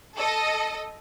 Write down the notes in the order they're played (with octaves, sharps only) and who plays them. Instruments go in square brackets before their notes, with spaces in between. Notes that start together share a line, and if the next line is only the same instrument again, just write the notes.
[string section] A4 D#5